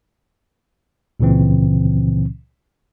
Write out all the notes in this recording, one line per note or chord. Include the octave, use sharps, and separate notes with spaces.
C#2 A#2 C#3 E3 C4